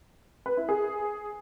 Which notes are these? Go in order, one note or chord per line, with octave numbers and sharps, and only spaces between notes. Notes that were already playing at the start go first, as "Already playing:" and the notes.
B4
E4
G#4